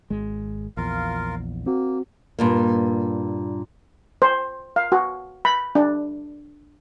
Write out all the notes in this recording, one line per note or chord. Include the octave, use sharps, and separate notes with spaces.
G#1 G#3
A#1 E2 F4 A#4 F5
A#3 C4 F#4
G2 A#2 A#3
C5
F5
F#4
B5
D4